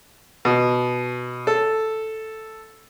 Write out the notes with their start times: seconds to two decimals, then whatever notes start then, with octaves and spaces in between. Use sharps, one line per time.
0.45 B2
1.47 A4